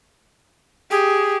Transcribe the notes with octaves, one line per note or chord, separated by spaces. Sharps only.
G4 G#4